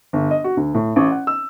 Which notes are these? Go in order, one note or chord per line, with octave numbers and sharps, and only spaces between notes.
G1
D#5
F#4
D2
A2
A1
F#5
E6